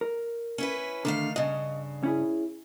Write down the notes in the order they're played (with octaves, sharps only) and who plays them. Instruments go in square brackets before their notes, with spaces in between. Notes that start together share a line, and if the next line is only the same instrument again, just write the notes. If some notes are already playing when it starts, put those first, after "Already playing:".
[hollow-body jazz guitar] A#4
[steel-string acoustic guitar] C#4 E4 B4
[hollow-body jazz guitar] D3 [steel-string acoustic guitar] D#3 A3 F5
[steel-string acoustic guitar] G2 C#3 [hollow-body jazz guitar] D#5
[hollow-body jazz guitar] C#4 E4 G#4